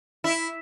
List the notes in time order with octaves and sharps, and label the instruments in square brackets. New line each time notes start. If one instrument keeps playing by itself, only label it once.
[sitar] E4